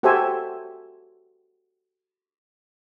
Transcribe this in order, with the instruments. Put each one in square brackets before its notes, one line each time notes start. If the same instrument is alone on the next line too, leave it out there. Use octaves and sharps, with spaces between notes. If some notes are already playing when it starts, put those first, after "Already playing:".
[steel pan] F#4 G4 A4 C5 E5 G#5